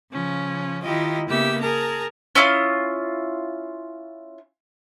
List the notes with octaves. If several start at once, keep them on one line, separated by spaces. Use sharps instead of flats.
C#3 F3 C#4
D#3 E4 F4 G4 D#5
C#3 A#3 B3 G4 E5 E6
G#4 A#4 A5 A#5
C#4 E4 F4 D#6